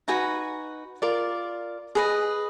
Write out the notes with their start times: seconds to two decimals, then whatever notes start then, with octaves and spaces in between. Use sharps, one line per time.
0.08 D#4 F#4 B4 G#5 A#5
1.02 F4 A#4 D5
1.95 G#4 B4 D#5